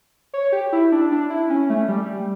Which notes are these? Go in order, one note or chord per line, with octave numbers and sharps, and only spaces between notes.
C#5
G4
E4
D4
D4
E4
C#4
A3
G3